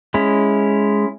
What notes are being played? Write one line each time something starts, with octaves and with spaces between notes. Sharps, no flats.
G#3 C#4 E4